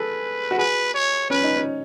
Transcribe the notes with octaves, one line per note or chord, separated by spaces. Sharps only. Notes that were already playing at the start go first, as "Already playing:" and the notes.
Already playing: G#4 A4 B4
F#4
G#4 B4
C#5
C#4 B4
D#4
C#4